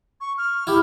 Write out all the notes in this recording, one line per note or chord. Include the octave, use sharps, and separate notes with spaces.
C#6
F6
E4 G4